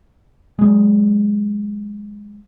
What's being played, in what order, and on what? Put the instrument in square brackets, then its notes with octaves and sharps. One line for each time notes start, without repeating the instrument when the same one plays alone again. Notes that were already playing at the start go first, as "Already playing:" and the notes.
[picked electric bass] F#3 G#3